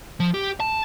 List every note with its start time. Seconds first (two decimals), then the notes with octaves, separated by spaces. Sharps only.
0.20 F3
0.34 G4
0.60 A5